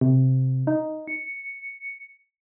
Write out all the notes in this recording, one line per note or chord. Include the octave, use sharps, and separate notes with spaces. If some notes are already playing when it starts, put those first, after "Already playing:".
C3
D#4
C#7